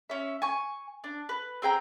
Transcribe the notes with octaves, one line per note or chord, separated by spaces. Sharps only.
C#4 E5
G#5 C#6
D4
B4
C4 G#4 G5 A#5